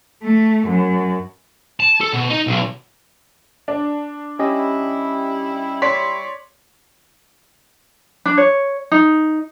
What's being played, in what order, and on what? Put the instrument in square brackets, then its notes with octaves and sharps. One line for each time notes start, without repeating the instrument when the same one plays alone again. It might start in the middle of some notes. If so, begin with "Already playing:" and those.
[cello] A3
F#2
[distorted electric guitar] A5
A4
B2
D#4
B1
[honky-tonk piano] D4
[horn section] G3 E4 [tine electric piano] C#4 G4 D#5
[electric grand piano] C#5 D5 C6 [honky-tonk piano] B6
[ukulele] D4
C#5
D#4